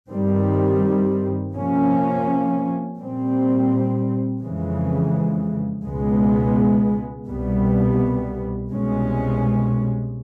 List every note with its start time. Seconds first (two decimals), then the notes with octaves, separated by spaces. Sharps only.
0.11 G2 D#3 G3 C4
1.54 C3 F3 A#3 C#4
2.98 A#2 G3 C4
4.41 F2 C#3 E3 G#3
5.84 C#2 B2 G#3 B3
7.26 C2 B2 G3 B3
8.70 C2 B2 G#3 C#4